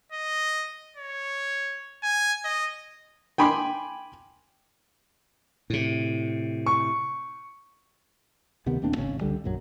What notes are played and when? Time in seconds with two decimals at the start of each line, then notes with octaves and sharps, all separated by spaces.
0.12 D#5
0.97 C#5
2.03 G#5
2.44 D#5
3.38 G5 G#5 B5 C6 D6
5.70 A2 C3
6.66 C#6
8.66 D2 C3 D#3 B3
8.82 D1 A#3 C4 D4
8.98 G#1 C#3
9.21 C#2 D3 G3
9.44 A#1 F#2 F#3